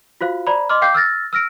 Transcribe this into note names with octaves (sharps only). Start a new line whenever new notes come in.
F4 F#4 C5 F5
C5 D5 A#5 B5
D#5 C6 D6 F6
F5 G5 D6 G6 C7
E6 F6 A6 A#6
E6 F6 A#6 D7